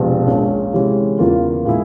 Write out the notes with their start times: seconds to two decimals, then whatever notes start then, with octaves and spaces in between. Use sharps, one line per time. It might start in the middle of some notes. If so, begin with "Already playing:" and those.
Already playing: E1 E2 C3 F3 C4
0.27 A#1 A#2 G#3 C#4
0.73 C3 E3 G#3 C#4
1.19 E2 C#3 E3 A#3 F4
1.65 A#2 G#3 E4 G#4